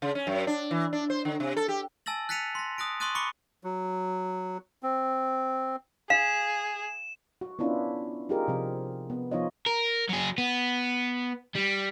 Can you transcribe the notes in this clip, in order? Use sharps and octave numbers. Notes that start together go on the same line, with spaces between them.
C#3
C#4
F#2
D4
E3
D4
C5
D3
C3
A4
G4
G#5 A5 E6 A6 A#6 F#7
F#6 A6 B6 C#7 D#7 F7
C6 A#6
D#6 F#6 A#6 D7
C6 C#6 D#6 F#6 A6 D#7
B5 C#6 D6 C#7 G7
F#3
C4
G#4 F5 E7
F#4
B3 C#4 D4 E4 F4
D#4 F4 G4 G#4 A#4
C3 F3 C4
B3
F3 B3 D#4 F4 C#5 D#5
A#4
F#3 G#4
B3
G3